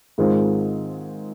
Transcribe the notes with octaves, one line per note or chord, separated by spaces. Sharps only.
G#2 D#3 G#3 C4 F4